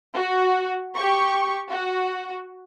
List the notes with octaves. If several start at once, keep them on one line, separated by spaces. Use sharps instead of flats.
F#4
G4 C#6
F#4